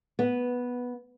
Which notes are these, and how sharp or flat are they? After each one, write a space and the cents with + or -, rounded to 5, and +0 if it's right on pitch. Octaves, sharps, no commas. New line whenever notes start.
B3 -5